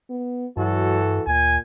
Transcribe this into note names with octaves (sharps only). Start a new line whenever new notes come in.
B3
G2 E3 F#3 F#4 A4
D2 A#2 G#5